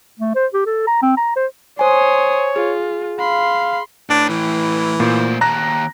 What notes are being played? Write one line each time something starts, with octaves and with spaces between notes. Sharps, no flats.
A3
C5
G4
A4
A#5
C4
A#5
C5
C5 C#5 G#5 C6 D#6
F4 G#4
F5 B5 C6
A2 D4 B4
E3
A#2 A3 C5
D#2 A5 A#5 F#6 A#6